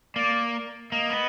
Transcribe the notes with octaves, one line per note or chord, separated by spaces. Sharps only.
A#3 D5
A#3 D#5
B3